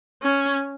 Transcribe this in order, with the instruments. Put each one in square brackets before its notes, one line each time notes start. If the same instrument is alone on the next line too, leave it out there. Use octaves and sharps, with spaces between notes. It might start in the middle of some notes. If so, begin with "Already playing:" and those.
[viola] C#4